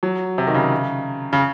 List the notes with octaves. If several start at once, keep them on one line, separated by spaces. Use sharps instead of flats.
F#3
C3
D#3
C#3
C#3